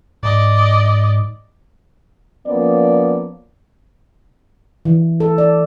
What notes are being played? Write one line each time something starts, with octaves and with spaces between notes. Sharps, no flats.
G#2 D5 D#5
F3 A#3 B3 C#4 D5
E3
A4
D5